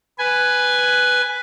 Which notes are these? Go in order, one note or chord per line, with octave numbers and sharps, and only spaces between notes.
B4 G#5